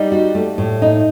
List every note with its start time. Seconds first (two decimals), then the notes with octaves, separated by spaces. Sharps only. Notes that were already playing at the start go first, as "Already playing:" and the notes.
Already playing: G3 D#4
0.12 F#4
0.35 A3
0.58 A2
0.82 D#4